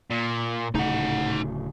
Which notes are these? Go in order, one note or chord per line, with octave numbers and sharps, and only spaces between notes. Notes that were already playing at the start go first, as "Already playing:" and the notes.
A#2
D1 C#3 A3 D#4 F#5